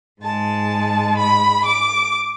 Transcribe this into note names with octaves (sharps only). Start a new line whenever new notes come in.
G#2 G#3 A5
B5
D6